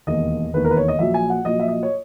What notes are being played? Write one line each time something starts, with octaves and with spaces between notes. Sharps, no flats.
E1 D#2 D#3 D#5
E1 D#2 D#3 B4
A#4
B4
C#5
D#5
A#1 A#2 F#3 E5
G#5
F#5
A#1 A#2 F#3 D#5
E5
D#5
C#5